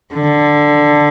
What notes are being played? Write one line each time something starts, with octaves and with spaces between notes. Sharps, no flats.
D3